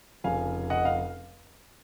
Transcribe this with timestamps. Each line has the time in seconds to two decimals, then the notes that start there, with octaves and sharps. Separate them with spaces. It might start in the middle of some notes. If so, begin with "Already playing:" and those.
0.24 F1 F2 C#3 F3 F5 G#5
0.70 D#5 F#5
0.85 F5